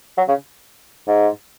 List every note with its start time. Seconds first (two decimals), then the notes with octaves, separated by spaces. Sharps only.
0.18 F#3
0.28 C#3
1.07 G#2